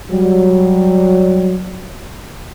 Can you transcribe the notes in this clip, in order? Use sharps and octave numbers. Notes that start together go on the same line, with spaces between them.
F#3 G3